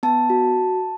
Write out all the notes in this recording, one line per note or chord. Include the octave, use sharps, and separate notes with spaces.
B3 A5
F#4